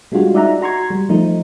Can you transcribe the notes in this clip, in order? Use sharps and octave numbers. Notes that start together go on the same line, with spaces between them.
G3 G#3 D4 F4 F#4
D#4 D5 E5 F#5 A#5
F#4 A#5 C6 C#6 G#6
G3
F3 A3 D#4